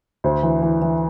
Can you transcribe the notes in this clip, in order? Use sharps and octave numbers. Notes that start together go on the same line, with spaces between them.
D2 C5
E3
E3
E3